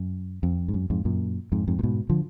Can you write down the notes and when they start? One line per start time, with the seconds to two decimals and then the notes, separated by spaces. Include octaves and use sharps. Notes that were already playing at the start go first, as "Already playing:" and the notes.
Already playing: F#2
0.43 F2
0.68 G#2
0.74 F#2
0.90 F2 G#2
1.05 F#2 A#2
1.52 F2 G#2
1.68 F2 G#2
1.79 A#2
1.83 G#2 B2
2.10 D3 F3